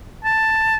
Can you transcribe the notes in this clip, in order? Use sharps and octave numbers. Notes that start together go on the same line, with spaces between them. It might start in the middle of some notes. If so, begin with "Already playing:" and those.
A5